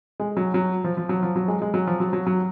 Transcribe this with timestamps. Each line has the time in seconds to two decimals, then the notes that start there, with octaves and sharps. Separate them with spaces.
0.20 G#3
0.37 F#3
0.54 F#3
0.84 F3
0.97 F3
1.09 F#3
1.23 F3
1.36 F#3
1.48 G#3
1.62 G#3
1.74 F#3
1.87 F3
2.00 F#3
2.13 F#3
2.26 F#3